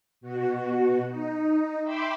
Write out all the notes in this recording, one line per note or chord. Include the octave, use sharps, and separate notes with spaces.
B2 F#4
D#4
E5 G5 B5 C6 D6 E6